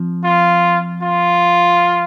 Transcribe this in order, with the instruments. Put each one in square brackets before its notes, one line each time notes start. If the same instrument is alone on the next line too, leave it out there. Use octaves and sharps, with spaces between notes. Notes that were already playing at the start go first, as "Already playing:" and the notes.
Already playing: [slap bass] F3 C4
[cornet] F4
F4